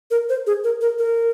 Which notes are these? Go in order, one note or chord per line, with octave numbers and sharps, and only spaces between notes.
A#4
C5
G#4
A#4
A#4
A#4